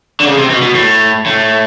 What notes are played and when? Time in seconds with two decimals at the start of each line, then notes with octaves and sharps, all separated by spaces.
0.20 D3
0.25 C#3
0.38 C3
0.50 B2
0.62 B2
0.75 A2
1.26 A2